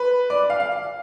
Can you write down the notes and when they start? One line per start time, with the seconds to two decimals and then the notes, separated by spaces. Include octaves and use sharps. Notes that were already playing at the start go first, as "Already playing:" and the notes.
Already playing: B4
0.30 D5
0.50 F5
0.60 F5